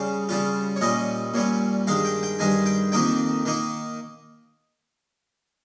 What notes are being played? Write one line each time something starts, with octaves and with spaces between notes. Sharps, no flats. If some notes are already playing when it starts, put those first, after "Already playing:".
Already playing: C#3 G3 C#4 F5
C#3 G3 C#4 F4
C#5
A#2 G3 C#4 D#5
A#2 G3 C#4 C#5
G2 D#3 G#3 F5
G5
G5
G2 D#3 G#3 G#5
G5
F2 D#3 A#3 D#4 G5
D#3 A#3 D#4